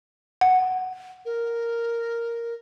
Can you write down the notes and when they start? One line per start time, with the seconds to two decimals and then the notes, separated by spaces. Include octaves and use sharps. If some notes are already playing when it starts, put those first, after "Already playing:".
0.41 F#5
1.25 A#4